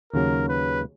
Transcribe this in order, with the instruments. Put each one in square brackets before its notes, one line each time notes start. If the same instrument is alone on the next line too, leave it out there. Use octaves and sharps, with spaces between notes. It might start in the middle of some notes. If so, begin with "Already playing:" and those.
[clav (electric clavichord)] D#2 C#3 F#3 C#4 [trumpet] A#4
[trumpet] B4